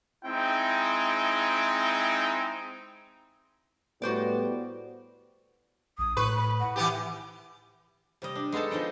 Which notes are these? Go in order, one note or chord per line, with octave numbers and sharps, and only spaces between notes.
G#3 C4 D#4 E4 G5
A2 G3 B3 F#4 C5 D5
A#1 D#6
A2 B4 C#6
B5
F#5
E3 B3 G4
C3 G3 D#5
D4
G#3 B3 D#4 A4 A5
F3 D#4 D#5 G5